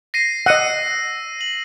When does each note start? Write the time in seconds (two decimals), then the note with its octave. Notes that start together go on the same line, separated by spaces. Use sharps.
0.14 A#6 C7 D#7
0.46 D#5 F#5 E6 A#6 D#7
1.41 F#7